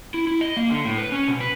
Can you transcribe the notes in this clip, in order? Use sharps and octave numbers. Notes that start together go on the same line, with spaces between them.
E4
E4
D#5
A#3
D3
A2
B4
C#4
B2
B4